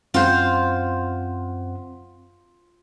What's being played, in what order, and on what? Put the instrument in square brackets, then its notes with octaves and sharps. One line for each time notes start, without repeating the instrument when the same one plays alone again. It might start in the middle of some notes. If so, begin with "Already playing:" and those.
[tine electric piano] F#2 C4 F#5 [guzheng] F4 C5